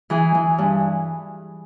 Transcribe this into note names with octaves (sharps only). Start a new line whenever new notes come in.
E3 G#4
E3
G2